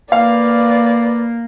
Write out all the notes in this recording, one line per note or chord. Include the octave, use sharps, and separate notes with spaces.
A#3 B4 D5 F5